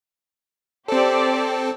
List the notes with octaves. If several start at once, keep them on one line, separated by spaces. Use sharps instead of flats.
C4 G4 A4 C5 D5